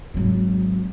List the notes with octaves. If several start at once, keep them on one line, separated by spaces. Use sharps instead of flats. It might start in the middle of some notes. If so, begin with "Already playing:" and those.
G#1 F#3